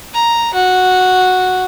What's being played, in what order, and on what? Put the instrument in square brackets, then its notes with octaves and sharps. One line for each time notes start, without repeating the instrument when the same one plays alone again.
[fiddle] A#5
F#4